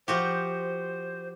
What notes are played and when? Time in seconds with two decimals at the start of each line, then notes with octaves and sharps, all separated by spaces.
0.08 F3 F#4 G4 C5